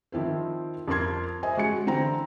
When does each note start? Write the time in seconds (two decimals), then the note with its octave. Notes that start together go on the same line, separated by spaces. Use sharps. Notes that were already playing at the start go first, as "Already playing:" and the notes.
0.12 D#3 F3 C4 E4 C5
0.88 F2 F4 A#4 A5 C6 G#6
1.43 C5 D#5 E5 G#5
1.57 G#3 F#4 G#5 C#7
1.86 D3 E3 C4 G5 A#5